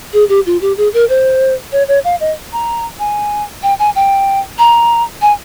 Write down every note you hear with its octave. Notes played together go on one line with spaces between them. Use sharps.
G#4
G4
F4
G4
G#4
A#4
C5
C#5
C#5
F5
D#5
A#5
G#5
G5
G#5
G5
A#5
G#5